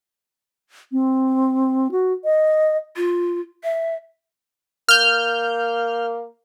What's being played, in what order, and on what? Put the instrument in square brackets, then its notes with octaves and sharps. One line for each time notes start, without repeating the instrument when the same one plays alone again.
[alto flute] C4
F#4
D#5
[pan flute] F4
E5
[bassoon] A#3 [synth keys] F6 G6